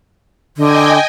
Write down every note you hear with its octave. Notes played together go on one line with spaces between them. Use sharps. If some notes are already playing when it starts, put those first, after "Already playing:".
D3 D#5 G5 G#5